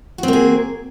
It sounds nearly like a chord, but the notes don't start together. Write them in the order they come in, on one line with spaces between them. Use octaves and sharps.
F#4 C4 A#3 G#4